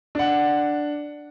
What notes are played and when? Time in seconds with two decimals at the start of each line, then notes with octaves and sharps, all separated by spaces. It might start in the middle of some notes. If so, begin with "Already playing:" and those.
0.15 D4 F#5